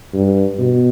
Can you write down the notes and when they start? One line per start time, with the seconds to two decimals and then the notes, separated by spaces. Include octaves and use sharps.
0.14 G2
0.59 B2